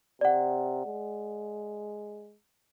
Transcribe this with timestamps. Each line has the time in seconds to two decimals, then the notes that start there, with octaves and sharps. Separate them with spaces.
0.21 C3 D5 F#5
0.86 G#3